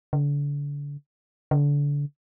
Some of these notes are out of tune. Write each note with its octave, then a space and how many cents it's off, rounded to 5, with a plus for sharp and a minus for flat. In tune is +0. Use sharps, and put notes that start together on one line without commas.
D3 -35
D3 -30